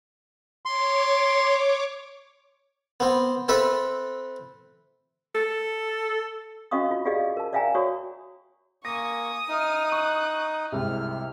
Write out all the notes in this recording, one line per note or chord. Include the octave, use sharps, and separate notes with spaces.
C#5 C6 D6
B3 C4
C4 A4 B4 E5
A4
C#4 F#4 D#5 F5 C#6 D#6
F4
F4 G4 G#4 D5 D#5 F5
A#4 A5
D5 E5 F5 G5 G#5 A#5
F#4 C#5 D5 C#6 D#6
A#3 G#5 C#6 D#6 A#6
D#4 E5 F6
C#6 F#6
C2 G#2 C3 F6